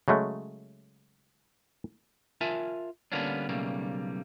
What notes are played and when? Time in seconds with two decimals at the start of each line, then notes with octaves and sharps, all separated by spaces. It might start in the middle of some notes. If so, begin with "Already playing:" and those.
0.08 C#3 F#3 G#3 A3
2.41 F4 A#4 E5 G#5 A5
3.12 D3 G3 A#3 B3 C#4 D4
3.49 B1 C#3 G3 A3 A#3